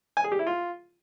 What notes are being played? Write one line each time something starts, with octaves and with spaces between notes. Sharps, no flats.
G#5
G#4
G4
E4
F4